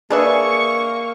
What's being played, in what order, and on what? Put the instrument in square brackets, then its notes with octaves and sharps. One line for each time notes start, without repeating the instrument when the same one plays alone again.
[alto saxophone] A#3 [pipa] D4 B4 E5 [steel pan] G#4 D5 [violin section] C#6